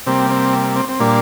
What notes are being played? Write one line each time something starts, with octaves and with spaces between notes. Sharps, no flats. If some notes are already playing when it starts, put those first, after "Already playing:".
C3 G3 A#3 C4
C4
C4
C4
A#2 G3 A#3 D4